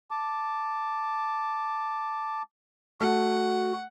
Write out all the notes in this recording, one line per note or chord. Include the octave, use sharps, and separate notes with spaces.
A5 D6
A3 F#4 F#5